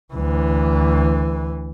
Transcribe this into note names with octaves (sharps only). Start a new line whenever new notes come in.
D2 E3